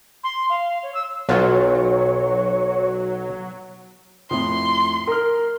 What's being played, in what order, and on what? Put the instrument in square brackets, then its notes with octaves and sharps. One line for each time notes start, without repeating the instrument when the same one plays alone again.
[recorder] C6
F5
C#5
E6
[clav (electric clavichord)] B1 F4 [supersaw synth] F#3 [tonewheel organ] C#5
[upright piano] F2 A2 [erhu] C6
[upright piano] A#4 F6